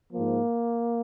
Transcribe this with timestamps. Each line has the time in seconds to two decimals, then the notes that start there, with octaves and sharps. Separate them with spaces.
0.12 G#2 F3 A#3